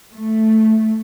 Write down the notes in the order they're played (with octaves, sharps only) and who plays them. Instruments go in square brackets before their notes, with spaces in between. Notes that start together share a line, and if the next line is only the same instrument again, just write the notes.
[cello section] A3